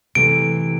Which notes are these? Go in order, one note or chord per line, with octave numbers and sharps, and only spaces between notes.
C3 E3 A3 D7